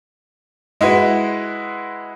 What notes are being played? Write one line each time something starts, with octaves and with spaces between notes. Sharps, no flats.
G#3 E4 F#4 B4